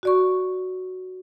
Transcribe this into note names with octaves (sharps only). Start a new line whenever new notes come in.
F#4 D5 C#6